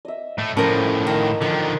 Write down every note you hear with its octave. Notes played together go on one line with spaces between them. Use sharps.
D#5 E5
A2 A3
A2 F3 C#4 A4 A#4
D#3 A#4 D#5
D3 D#3 F3